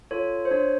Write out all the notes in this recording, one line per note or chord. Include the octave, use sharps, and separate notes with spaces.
F4 A4 C#5
C5
D4 C#5